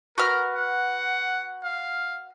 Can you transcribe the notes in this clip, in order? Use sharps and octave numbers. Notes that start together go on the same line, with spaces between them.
F#4 A#4 B4 F6
F#5
F5